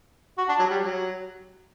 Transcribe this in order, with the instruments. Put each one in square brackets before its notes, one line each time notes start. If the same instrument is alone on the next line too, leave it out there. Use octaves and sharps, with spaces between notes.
[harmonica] F#4
D4
F#3
G3
F#3